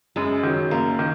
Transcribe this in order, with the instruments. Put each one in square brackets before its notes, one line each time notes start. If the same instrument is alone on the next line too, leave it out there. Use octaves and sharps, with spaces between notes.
[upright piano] F#2 [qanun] G#3
[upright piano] D#3 F#3
[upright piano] F#2 [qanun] A#3
[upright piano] D#3